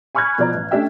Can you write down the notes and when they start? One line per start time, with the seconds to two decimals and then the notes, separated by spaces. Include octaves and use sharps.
0.15 G#5 B5 C#6 F6 F#6 G#6
0.38 B2 F3 D5 A#5
0.54 A1
0.71 A3 C#4 D4 G4 E5 G5